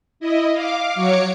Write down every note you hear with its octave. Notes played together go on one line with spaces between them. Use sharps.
E4 D#5
F5 D6
F#3 C#5 D6 C#7